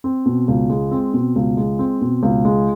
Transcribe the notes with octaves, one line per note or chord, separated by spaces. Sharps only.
C4
B2
C#2
G#3
C4
B2
C#2
G#3
C4
B2
C#2
G#3